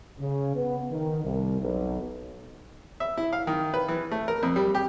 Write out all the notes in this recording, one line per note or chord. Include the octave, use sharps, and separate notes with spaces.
C#3
B3
D#3
C2
B1
E5
E4
F5
D#3
B4
E3
A3
A#4
F2
G3
G4